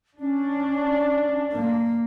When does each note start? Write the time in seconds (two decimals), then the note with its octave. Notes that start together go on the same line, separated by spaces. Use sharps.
0.20 C#4 D4
1.53 A#3